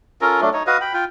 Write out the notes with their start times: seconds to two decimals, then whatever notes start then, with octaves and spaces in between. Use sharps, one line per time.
0.21 C#4 F4 A4 A#4
0.41 F#3 A3 D4
0.53 D#4 C#5
0.67 F#4 B4 D#5 F5
0.81 G5 B5
0.94 F4 G5